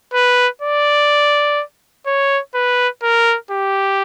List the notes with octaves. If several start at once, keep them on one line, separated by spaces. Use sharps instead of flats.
B4
D5
C#5
B4
A#4
G4